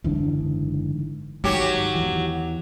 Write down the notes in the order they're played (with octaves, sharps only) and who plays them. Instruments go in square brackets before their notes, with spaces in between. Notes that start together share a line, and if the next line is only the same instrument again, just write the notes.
[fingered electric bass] F#1 G#2 E3 [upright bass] D3 D4
[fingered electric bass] G#2 [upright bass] D#3 [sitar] F#3 G4
[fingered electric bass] E2 E3